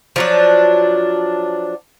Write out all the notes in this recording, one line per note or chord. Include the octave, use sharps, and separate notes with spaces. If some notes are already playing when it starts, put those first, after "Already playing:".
F3 F#3 D4